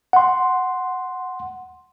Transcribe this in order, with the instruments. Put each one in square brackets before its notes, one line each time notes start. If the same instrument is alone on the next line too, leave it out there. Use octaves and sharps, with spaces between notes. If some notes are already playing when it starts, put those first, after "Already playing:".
[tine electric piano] F#5 C6